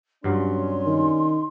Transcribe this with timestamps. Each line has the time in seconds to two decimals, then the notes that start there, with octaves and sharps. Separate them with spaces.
0.24 G2 C3 F#3 G3 C#4 C6
0.86 D#3